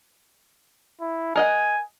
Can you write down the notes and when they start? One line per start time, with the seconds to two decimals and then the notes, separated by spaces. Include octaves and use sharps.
1.01 E4
1.36 A#4 D#5 F#5 G#5